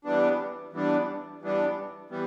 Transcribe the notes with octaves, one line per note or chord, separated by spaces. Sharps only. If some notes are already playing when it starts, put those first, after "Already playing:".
E3 G3 B3 D4
E3 G3 B3 D4
E3 G3 B3 D4
E3 G3 B3